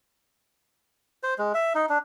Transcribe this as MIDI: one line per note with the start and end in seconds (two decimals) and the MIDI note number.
1.23 1.34 72
1.39 1.53 56
1.54 1.73 76
1.75 1.86 63
1.89 1.98 62